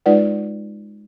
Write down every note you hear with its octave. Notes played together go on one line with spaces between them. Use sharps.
G#3 D#4 F4 B4 D5 F#5